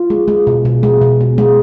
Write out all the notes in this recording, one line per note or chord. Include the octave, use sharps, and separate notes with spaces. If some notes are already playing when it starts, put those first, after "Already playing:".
Already playing: F4
G#3
G#3
B2
B2
G#3
B2
B2
G#3